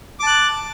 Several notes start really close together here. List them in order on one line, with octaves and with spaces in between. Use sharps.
D6 A5 F#6